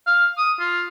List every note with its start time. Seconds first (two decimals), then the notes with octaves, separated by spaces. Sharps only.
0.07 F5
0.38 D#6
0.60 F4